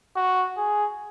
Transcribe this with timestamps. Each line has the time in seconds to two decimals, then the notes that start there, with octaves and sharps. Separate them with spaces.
0.16 F#4
0.57 G#4